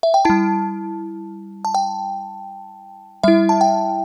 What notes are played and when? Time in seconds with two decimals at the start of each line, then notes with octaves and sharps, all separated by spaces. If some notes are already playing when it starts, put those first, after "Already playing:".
0.03 E5
0.14 G5
0.25 G3 E4 A5
1.65 A5
1.75 G5
3.23 G3 E4 E5
3.49 A5
3.61 G5